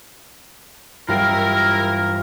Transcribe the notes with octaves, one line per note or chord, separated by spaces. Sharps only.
G2 E3 F#3 E4 F4 G4 A#4